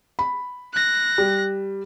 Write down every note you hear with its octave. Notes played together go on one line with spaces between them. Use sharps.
B5
F#6 A#6
G3